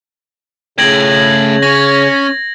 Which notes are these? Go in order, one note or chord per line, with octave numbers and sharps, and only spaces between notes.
C#3 A3 G5 G#6 A#6 F#7
C#4 A#6